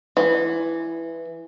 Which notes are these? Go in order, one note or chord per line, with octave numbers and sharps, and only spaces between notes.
E3